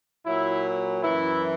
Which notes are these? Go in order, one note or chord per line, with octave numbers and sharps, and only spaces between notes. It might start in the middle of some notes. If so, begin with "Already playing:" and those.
A#2 F#3 E4
F#2 E3 E4